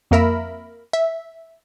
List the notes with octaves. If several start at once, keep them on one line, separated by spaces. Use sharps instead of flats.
F2 A#3 A#4 E5 B5
E5